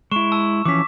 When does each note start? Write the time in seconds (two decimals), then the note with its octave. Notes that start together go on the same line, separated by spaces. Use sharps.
0.11 G#3 E4 C#6 E7
0.32 A5 E6
0.65 E3 F3 C#4 D6 B6